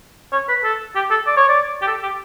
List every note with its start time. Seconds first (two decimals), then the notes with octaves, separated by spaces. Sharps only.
0.33 C#5
0.49 B4
0.64 A4
0.96 G4
1.11 A4
1.26 D5
1.37 C#5
1.48 D5
1.82 G4
1.88 A4
2.03 G4